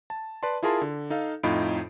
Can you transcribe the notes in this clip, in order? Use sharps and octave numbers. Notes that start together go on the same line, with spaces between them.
A5
B4 D5 A5 C6
E4 F4 G#4 A#4 A5 C6
D3
D#4 A4 F5
F2 A2 D#4 F4 B5 D7